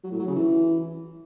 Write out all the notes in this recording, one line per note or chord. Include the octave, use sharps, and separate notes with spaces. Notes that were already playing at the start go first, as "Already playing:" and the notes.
F#3
A2
F#3
C#3
E3